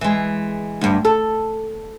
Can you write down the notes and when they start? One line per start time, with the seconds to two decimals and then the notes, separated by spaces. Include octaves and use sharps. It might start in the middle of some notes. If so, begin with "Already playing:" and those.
0.01 E3 G#3
0.81 D2 G2
1.05 A4